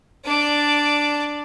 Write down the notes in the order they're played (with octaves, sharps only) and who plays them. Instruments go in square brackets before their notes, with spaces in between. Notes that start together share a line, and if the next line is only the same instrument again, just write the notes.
[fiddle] D4 D5